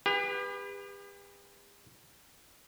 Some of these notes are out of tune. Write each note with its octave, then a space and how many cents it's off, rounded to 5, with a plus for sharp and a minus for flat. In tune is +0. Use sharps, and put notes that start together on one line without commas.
G4 +40 B4 +0